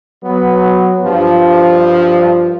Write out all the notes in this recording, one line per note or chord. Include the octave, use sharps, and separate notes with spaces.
F#3 B3
G2 F3